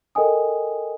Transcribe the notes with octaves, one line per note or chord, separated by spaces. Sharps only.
A4 A#4 D#5 G5 G#5 D#6